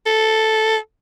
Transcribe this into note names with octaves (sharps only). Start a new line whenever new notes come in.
A4